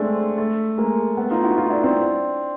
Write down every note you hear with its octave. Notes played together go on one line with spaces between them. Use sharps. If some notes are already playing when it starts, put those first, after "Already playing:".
Already playing: G#3 A3 C4 D4
A3
G#3 A#3
A3 B3
D#4 F4
E4 F#4
D#4 F4
D4 E4
C4 D4